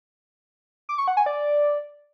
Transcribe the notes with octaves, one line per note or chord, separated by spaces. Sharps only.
D6
C#6
F#5
G#5
D5